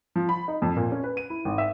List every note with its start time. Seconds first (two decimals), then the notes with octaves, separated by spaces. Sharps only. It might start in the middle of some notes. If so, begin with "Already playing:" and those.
0.16 F3
0.29 B5
0.48 D#4
0.62 F2
0.77 A#2
0.92 C#4
1.04 B4
1.17 D#7
1.30 E4
1.45 G#1
1.58 E5